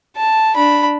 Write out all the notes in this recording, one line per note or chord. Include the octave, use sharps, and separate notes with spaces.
A5
D4 B5